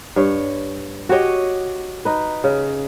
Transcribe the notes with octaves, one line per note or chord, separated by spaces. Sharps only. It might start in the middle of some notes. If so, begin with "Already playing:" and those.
G2 C#5
F#4 G4 C#5 D#5
D#4 B4
C#3